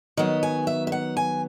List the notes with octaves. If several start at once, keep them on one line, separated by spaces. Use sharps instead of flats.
D#3 F#3 B3 D#5
G#5
E5
E5
F#5
G#5